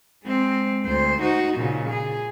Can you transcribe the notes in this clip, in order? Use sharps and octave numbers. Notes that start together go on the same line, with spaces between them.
G#3 C4
D2 C5
D#4 F#4
A#2 C#3
G#4